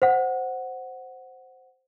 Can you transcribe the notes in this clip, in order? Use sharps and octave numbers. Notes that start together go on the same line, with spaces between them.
C5 F#5